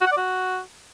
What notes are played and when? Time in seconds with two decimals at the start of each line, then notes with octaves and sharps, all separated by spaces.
0.01 F#4
0.06 F#5
0.12 D5
0.17 F#4